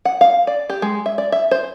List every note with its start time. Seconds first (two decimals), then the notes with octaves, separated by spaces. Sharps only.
0.05 F#5
0.21 F5
0.47 D5
0.70 G4
0.82 G#3
1.06 E5
1.18 D5
1.32 E5
1.51 C5